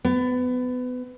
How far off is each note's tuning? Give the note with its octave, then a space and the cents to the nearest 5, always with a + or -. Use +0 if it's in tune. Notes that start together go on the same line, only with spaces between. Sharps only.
B3 +25